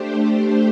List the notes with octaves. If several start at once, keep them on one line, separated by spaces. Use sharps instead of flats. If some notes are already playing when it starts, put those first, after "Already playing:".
Already playing: A3 D4 G4 C5